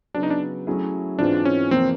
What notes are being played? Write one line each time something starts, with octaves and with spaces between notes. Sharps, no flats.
C#3 F#3 B3 D4
D#4
D4
F#3 A3 C#4 E4 G#4
G#2 E3 G#3 C4 D4 F4
C#4
E2 C3 F3 A#3 C4